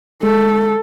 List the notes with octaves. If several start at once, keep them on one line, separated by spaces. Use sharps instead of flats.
G#3 A4